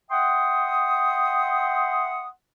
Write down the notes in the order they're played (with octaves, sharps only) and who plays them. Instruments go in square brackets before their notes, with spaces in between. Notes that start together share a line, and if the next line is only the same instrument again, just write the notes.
[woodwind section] E5 F#5 G5 C6 D#6